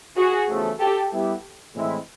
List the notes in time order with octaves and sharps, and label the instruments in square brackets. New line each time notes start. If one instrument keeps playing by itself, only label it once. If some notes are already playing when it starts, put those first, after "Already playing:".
[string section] F#4 G#4
[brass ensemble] E2 C#3 F3 A3
[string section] G4 A4
[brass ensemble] G3 B3 E4 G4
A2 E3 G#3 C4 E4